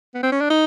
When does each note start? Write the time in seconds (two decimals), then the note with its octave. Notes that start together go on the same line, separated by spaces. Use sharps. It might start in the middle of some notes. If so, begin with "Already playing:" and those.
0.14 B3
0.23 C4
0.32 C#4
0.41 D4
0.50 D#4